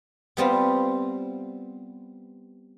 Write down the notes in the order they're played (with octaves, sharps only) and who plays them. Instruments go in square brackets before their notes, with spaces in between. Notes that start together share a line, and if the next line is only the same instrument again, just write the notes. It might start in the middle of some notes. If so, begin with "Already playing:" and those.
[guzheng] G3 B3 C4 F4